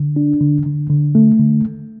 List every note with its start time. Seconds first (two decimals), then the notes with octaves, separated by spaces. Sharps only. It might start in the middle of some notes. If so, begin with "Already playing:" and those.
Already playing: D3
0.16 D4
0.41 D3
0.66 D3
0.90 D3
1.15 A3
1.40 D3